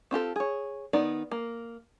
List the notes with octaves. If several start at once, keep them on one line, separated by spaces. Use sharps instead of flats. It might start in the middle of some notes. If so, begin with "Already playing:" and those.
C4 F4 G4 A4
G#4 C#5
D#3 B3 D#4 D5
A#3